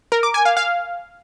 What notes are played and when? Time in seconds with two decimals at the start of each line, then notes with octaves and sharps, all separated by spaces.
0.12 A#4
0.23 D6
0.34 G#5
0.45 F5
0.57 F5